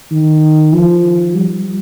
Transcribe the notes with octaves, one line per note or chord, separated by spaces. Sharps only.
D#3
F3
G3